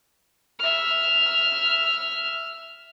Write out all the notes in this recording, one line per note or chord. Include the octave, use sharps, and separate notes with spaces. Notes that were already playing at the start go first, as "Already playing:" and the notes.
E5 F6